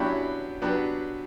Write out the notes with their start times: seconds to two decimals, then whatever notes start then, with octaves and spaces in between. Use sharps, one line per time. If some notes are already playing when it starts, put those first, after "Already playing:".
Already playing: F#3 B3 C#4 D4 E4 G4 B4
0.62 F#3 B3 D4 G4 B4